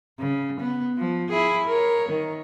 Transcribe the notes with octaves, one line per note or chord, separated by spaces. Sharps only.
C#3
B3
F3
E4 G#4
A#4 C#5
D#3